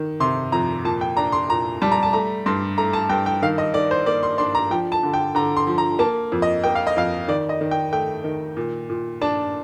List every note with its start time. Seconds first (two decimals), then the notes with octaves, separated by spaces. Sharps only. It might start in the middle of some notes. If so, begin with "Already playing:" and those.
Already playing: D#3
0.20 C3 C6
0.52 F2 A#5
0.84 A#2 A5
1.01 G5
1.17 D4 A#5
1.32 C6
1.50 A#2 A#5
1.82 G3 A5
1.92 A#5
2.03 A5
2.13 A3 A#5
2.46 G2 C6
2.77 A3 A#5
2.93 A5
3.09 G2 G5
3.26 G5
3.42 D#3 F5
3.58 D#5
3.74 D#3 D5
3.91 C5
4.06 A#3 D5
4.23 C6
4.38 D4 C6
4.55 A#5
4.71 F3 G5
4.92 A5
5.03 D3
5.14 G5
5.35 D3 A#5
5.57 C6
5.67 F3
5.78 A#5
5.99 A#3 A5
6.32 F2
6.42 D#5
6.64 A#3 G5
6.75 F5
6.87 D#5
6.96 F2 F5
7.28 D#3 D5
7.49 D#5
7.61 D#3
7.71 G5
7.92 A3 G5
8.24 D#3
8.57 A#2
8.90 A#2
9.21 D4 A5